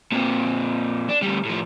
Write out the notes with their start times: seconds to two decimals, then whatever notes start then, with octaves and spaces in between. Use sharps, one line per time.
0.12 A#2 C4
1.09 D4
1.22 D2 G3
1.45 A2 F3